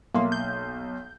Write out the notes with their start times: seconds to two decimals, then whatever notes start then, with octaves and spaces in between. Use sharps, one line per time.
0.14 B1 A#3 E5 C6
0.32 G6